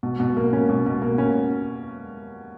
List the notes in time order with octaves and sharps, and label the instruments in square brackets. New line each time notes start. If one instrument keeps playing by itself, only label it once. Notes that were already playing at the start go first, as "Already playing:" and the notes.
[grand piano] B2
B2
A#3
C#4
B2
B2
A#3
C#4